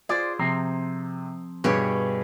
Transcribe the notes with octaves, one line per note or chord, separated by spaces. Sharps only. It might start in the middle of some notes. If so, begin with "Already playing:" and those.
F4 G#4 C5 D5
C3 F3 C4 A#5
G2 B2 G4 G#4 C#5